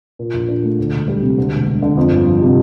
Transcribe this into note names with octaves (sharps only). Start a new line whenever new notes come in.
A#2
A#1
D4
A3
D2
E1
G3
C3
D2
E1
E1
D3
F2
G1
F3
C3